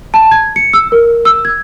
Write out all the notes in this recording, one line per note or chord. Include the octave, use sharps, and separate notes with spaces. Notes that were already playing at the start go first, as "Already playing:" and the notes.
A5
G#6
C#7
E6
A#4
E6
G#6